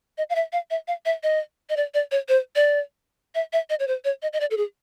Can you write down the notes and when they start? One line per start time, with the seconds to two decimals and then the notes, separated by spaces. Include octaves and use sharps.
0.18 D#5
0.30 F5
0.35 E5
0.53 F5
0.70 E5
0.88 F5
1.05 E5
1.23 D#5
1.70 D#5
1.77 D5
1.94 D5
2.11 C#5
2.29 C5
2.56 D5
3.35 E5
3.53 E5
3.70 D#5
3.80 C#5
3.88 C5
4.05 C#5
4.22 D#5
4.33 D#5
4.40 D5
4.51 A4
4.57 G#4